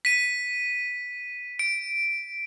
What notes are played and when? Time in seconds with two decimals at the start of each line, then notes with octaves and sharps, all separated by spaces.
0.05 B6 D#7
1.59 D7